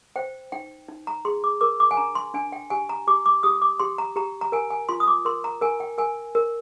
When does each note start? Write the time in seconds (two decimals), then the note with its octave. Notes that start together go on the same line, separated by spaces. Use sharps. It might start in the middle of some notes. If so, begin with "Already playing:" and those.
0.16 C5 G5
0.52 D#4 G5
0.88 D#4
1.07 A#5
1.25 G#4 C6
1.44 D6
1.61 A#4 D6
1.80 D6
1.91 G#5
1.97 D4 A#5
2.15 C6
2.34 D4 G#5
2.52 G5
2.70 G4 G#5
2.89 A#5
3.07 G4 D6
3.26 D6
3.43 G4 D#6
3.62 D6
3.80 G4 C6
3.98 A#5
4.16 G4 A#5
4.41 A#5
4.52 A#4 G#5
4.70 G#5
4.89 F4 C6
5.00 D#6
5.08 D6
5.25 A#4 C6
5.44 A#5
5.61 A#4 G#5
5.80 G5
5.98 A#4 G#5
6.35 A#4